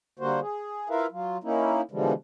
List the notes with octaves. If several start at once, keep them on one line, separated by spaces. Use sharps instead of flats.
D3 G3 A#3 F#4 C5
G#4
E4 F4 A#4 B4 E5 F5
F#3 F4
A#3 C#4 D#4 E4
B2 D3 E3 F3 G3 G#3